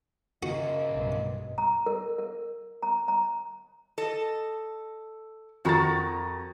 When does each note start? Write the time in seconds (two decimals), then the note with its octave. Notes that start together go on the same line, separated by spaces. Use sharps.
0.43 C#3 A#3 F#4 D#5
0.89 B1 G2
1.58 A#5
1.86 A#4
2.18 A#4
2.82 A#5
3.08 A#5
3.98 A4 D#5
5.65 F2 D#3 F#4 A#5 A6